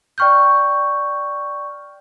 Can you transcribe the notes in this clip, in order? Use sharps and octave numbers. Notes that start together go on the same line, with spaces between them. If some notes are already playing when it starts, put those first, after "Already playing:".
D5 G5 C#6 F6 G6